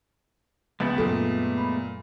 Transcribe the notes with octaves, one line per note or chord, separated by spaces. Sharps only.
C#2 G#3 A3 B3
F#2 A#2 F#3 A4
B5